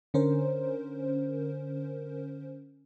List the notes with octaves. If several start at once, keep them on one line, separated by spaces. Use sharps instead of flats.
D3 C#4 A#4 C5